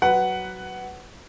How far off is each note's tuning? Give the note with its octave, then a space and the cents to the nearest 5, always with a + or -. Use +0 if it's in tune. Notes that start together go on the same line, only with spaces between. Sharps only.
F#3 +15 B4 +5 F#5 +15